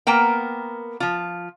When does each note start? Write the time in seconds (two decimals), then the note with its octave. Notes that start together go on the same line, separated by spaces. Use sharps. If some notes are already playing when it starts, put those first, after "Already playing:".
0.07 A#3 B3 A#4 G5
1.00 F3 F4